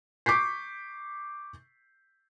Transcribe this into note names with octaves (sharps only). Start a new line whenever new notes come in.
C#6 D6 G6 B6 C7